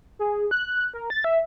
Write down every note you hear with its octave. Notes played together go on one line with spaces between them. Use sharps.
G#4
F#6
A#4
A6
E5